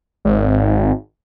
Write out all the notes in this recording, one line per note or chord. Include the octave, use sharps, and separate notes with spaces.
G#1